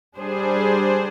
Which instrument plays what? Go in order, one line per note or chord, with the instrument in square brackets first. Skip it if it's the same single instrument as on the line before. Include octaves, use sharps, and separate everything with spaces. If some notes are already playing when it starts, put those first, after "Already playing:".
[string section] G3 D4 G#4 C5